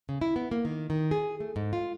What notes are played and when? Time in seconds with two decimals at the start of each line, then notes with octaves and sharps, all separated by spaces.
0.09 C#3
0.21 E4
0.36 B3
0.51 A#3
0.65 D#3
0.90 D#3
1.11 G#4
1.40 A3
1.56 G#2
1.73 F4